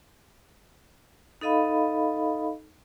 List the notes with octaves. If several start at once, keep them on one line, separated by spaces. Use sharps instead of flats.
D#4 A4 D#5 F5 B5